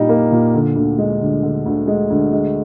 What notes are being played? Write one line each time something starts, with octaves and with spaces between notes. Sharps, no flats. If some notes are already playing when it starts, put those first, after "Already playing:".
Already playing: A#2 G3 D#4
A#3
A#2
D3
D2
G#3
D2
D3
D2
G#3
D2
G#3